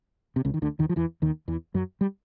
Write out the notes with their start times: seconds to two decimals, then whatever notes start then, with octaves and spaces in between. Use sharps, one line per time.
0.36 C3
0.45 C#2 C#3
0.54 D#3
0.62 D2 D3
0.79 D#2 D#3
0.89 F3
0.96 E2 E3
1.22 D#2 D#3
1.48 E2 E3
1.74 F#2 F#3
2.01 G3